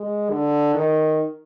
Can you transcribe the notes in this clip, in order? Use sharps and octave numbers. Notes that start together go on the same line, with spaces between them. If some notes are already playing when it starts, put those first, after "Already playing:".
Already playing: G#3
D3
D#3